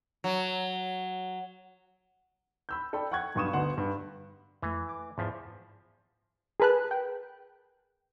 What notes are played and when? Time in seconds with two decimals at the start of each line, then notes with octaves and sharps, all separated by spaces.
0.24 F#3
2.69 B5 E6 G6
2.93 A4 D5 G5 B5
3.11 F#5 G5 C#6 F#6 G#6
3.35 B1 G2 F5 C#6 D#6 E7
3.53 D2 D3 B3 D#4 F#5 C6
3.78 G2
4.63 F2 E3 A3
4.89 D6
5.18 E2 G#2 F3
6.60 G#4 A#4 B4 A5 F#6
6.91 G5